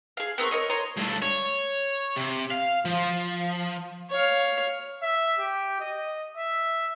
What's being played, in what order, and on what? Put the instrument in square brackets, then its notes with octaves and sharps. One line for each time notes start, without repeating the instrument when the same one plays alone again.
[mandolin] G#4 F5
B3 C4 A#4 C#6
A#4 C#5 D#5
C#5 D#5 A#5 C6
[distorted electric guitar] G2 A3
C#5
C3
F5
F3
[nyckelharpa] C#5 F5
[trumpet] E5
G4
D#5
E5